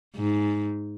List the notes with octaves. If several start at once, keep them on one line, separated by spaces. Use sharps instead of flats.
G#2